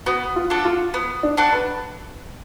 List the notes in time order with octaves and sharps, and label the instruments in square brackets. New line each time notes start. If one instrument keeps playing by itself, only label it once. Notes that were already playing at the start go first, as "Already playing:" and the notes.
[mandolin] B3 [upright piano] F#4
[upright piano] F4
[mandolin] D4 F#4 A4
[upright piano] F4
[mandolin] B3
[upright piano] D4
[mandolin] D4 F#4 A4
[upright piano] B4